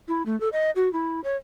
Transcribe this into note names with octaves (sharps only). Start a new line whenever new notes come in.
E4
A3
A4
D#5
F#4
E4
C#5